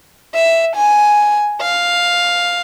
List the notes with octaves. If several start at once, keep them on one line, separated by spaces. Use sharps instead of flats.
E5
G#5
F5